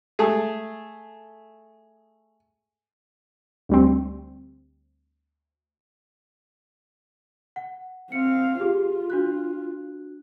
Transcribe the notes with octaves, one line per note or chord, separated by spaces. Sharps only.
A3 G#4
D2 G3 C4
F#5
C4 F5 C#7
F4 G4 G#4
D4 F#4 F#6